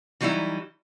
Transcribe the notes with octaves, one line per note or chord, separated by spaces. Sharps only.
E3 F#3 G3 D#4 E4